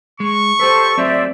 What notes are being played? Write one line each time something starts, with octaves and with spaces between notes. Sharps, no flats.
G#3 C#6
G4 A4 B4 C5
F#3 A3 C4 C5 D5 E5